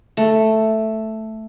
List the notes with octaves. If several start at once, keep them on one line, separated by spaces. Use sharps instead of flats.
A3